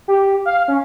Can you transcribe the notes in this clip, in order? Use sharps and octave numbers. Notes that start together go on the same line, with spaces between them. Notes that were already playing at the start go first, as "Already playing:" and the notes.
G4
F5
C#4